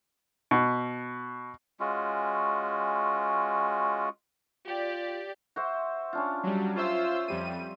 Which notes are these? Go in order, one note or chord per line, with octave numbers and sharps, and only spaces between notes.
B2
G#3 C#4 F4 F#4
F4 G4 D5
F#4 C5 E5
C#4 D4 F4
F#3 G3
F4 C5 C#5 E5 E6
F2 G3 C5 D#7